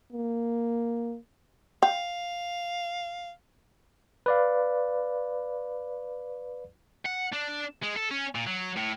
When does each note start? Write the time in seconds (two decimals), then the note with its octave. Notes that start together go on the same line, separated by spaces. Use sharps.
0.12 A#3
1.83 F5 G5
4.26 B4 D5 F5
7.06 F#5
7.33 D4
7.83 G#3
7.96 A4
8.11 C#4
8.35 A#2
8.47 F#3
8.76 A2